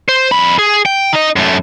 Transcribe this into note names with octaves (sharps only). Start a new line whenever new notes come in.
C5
F2 B5
G#4
G5
D#4 D#5
F#2 A3